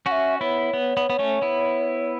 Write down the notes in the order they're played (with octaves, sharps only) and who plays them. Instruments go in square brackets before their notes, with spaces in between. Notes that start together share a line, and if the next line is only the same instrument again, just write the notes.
[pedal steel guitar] C#4 F#4 [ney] F#5
[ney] E5
[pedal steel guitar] B3 E4 [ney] C#5
[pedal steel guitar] B3
B3
B3
A3 C#4
B3 E4